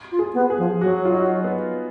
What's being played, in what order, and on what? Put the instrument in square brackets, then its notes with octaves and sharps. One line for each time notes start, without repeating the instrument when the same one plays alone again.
[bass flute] F4
[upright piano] G#4
[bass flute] B3
[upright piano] G#4
[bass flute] F3
[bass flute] F#3 [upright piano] F#4
[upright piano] F4
D#4
B3